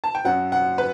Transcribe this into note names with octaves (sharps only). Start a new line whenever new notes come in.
A5
G5
F#2 F#3 F#5
F#5
B4